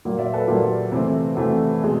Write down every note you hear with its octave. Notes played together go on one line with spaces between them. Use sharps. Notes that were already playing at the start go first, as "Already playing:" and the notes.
A#2 F#3 A#3
D5 E5
A4 B4
A#2 F#3 A#3 F4 G4
C3 E3 A3 C4
C3 E3 A3 C4 F#4
B2 G#3